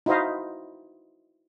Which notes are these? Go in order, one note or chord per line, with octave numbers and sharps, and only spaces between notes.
D#4 E4 F#4 C5 D#5 F5